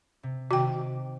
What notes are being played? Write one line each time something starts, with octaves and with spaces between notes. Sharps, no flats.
C3
C3 D#3 F#4 G5
D6